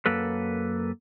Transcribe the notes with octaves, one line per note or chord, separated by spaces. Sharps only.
F#2 A#3 A4 B4